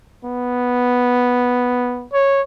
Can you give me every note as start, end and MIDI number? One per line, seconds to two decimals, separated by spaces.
0.25 2.07 59
2.13 2.42 73